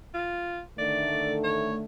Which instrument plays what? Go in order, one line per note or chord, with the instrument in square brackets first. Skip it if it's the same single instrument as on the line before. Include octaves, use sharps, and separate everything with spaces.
[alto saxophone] F4
[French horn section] D3 D#3 A3 [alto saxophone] D5
[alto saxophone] C#5